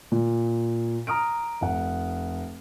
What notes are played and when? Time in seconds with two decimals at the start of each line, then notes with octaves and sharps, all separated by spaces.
0.12 A#2
1.07 A#5 D#6 F6 D7
1.61 F1 F#5